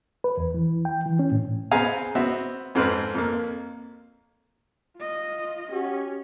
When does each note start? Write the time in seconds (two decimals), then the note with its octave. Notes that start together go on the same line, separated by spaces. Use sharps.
0.24 B4
0.37 E2
0.54 E3
0.85 G5
1.06 E3
1.19 C#4
1.32 A2
1.71 B3 C4 G#4 F5 G#5 A#5
2.15 B3 C4 F#4 E5
2.75 F2 G#2 C4 B4 F6
3.15 F2 A#3
4.97 F4 D#5
5.71 C#4 F#4 G4